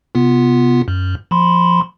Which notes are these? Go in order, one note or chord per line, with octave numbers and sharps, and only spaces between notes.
C3 B3 F4
F#2
F3 B5 C6